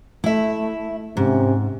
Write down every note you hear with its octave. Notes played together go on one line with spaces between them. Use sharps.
A3 E4 E5
G#2 C3 C#4